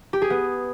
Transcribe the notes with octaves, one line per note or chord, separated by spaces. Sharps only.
G4
G#4
B3